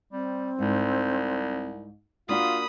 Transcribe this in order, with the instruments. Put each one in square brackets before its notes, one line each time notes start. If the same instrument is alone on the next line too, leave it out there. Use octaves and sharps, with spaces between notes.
[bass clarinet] G3 [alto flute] C4
[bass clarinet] C2 [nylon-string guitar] G#2
[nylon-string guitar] A#3 D4 F#4 [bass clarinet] F4 [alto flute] F5 [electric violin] B5 D#6